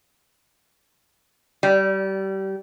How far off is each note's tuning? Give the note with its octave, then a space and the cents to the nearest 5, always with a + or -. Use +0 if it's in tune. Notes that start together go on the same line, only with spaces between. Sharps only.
G3 -25